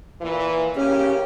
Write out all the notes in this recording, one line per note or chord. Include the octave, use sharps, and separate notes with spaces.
A#2 E3
C#3 A#3 C#4 G4